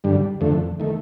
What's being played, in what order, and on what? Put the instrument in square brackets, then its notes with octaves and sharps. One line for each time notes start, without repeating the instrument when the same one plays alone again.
[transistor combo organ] G2 D3 G3
F2 D3 A3
D#3 A3